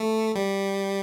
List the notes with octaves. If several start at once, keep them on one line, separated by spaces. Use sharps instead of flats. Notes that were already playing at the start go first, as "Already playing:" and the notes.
Already playing: A3
G3